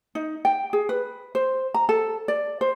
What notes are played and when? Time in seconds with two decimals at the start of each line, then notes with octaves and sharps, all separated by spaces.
0.15 D#4
0.45 G5
0.73 G#4
0.89 B4
1.35 C5
1.74 A#5
1.89 A4
2.28 D5
2.61 C5